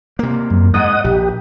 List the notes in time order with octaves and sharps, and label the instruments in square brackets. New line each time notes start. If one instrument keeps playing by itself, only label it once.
[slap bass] C3 A#3
[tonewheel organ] F#2
[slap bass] G#2 [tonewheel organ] D#5 F#5 D#6
[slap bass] A#1 [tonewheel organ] G4